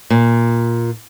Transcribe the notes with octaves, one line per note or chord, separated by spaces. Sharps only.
A#2